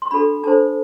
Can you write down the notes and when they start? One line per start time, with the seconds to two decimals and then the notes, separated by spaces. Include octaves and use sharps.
0.02 C6
0.11 D4 F#4 A4 B5
0.43 D4 A4 C5 A5